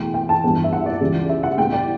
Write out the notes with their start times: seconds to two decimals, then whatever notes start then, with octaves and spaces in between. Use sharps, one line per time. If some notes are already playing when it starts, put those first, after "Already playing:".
Already playing: E2 B2 A3 G5
0.14 G5
0.29 A5
0.44 G2 E3 B3
0.64 E5
0.73 F#5
0.86 D5
1.01 C#2 C#3 E3 G3
1.29 E5
1.43 F#5
1.58 A2 G3 B3 G5
1.73 D5